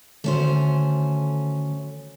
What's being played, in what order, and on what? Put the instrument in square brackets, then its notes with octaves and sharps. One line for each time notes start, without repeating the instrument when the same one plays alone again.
[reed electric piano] D3 D#3 F#4 [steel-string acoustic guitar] A3 C#4 C5